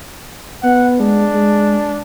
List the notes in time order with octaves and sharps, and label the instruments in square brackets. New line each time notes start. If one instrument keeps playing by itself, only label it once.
[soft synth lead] B3 [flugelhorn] F#5
[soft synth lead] G#3 [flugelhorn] D4
[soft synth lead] G#3